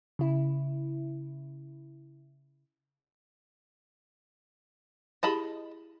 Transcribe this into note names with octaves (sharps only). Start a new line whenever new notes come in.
C#3 E4
E4 G4 G#4 D#5 A5 B5